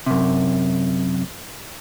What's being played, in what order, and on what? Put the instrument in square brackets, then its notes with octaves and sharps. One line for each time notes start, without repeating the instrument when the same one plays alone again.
[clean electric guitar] F#2 C3